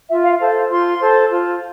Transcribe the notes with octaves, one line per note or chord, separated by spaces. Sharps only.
F4 E5
F5
A4 C5 F5
F4 C6
A4 C5
F4